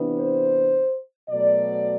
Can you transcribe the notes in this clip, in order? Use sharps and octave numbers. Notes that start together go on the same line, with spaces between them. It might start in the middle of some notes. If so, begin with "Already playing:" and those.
Already playing: C3 E3 B3 D4
C5
B2 F#3 A3 D5